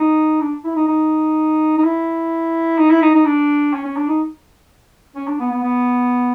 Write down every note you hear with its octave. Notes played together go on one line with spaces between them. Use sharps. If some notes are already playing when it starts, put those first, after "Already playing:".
Already playing: D#4
D4
E4
D#4
D#4
D#4
E4
D#4
E4
D#4
D#4
D4
C#4
C#4
D4
D#4
C#4
D4
B3
B3
B3